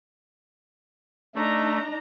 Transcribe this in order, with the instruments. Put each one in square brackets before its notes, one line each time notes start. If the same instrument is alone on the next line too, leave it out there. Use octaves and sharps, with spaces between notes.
[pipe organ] A3 [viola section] D4 D#4 A#5